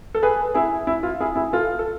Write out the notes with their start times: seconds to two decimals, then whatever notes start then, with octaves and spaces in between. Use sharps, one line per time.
0.15 A4
0.23 G#4 B4
0.54 E4 G#4
0.87 E4
1.03 F4
1.21 E4 G#4
1.36 E4 G#4
1.53 F4 A4
1.79 A4